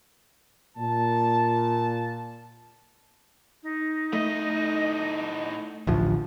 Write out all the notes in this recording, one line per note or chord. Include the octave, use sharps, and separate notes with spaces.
A#2 A5
D#4
A2 A3 D#5
A1 D2 F3